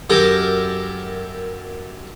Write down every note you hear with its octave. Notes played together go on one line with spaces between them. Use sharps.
F#2 G4 A4 A#4